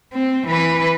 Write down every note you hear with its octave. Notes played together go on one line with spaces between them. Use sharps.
C4
E3 B4